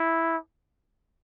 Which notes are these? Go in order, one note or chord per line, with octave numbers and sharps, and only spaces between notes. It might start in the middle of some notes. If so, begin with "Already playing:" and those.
Already playing: E4